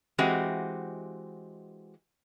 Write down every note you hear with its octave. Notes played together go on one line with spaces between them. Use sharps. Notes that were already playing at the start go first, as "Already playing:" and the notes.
E3 G#3 C4 F#4 G4 D#5